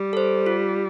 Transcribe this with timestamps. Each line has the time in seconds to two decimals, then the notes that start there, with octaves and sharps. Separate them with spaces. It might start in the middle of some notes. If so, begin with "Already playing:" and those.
Already playing: G3
0.13 A4 C5
0.46 F4